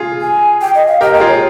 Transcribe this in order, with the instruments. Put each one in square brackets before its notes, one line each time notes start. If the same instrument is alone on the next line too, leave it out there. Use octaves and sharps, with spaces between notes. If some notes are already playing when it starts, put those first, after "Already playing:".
Already playing: [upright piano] F4 G#4
[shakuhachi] G#5
G5
D#5
F5
[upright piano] G4 A#4 [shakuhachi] D#5
[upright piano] A#4 [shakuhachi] D#5
[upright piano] F4 G#4
[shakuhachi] C#5